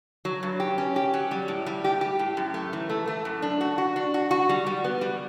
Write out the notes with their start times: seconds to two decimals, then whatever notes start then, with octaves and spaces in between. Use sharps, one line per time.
0.25 F#3
0.43 G2
0.60 G4
0.78 C#4
0.96 G4
1.13 F#3
1.31 G3
1.48 A2
1.66 G3
1.84 G4
2.01 G4
2.19 A2
2.37 F#2
2.54 A3
2.73 E3
2.89 A3
3.08 A3
3.25 F#2
3.42 D4
3.61 F#4
3.78 F#4
3.96 D4
4.14 F#4
4.31 F#4
4.49 G3
4.66 G3
4.84 B3
5.01 G3